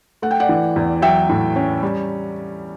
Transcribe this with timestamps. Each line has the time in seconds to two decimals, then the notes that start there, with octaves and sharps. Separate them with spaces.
0.22 A3 F#5
0.31 G5
0.40 D5 F#5
0.49 E3
0.76 E2
1.02 F#3 E5 G5
1.29 A2
1.56 C#4
1.83 G3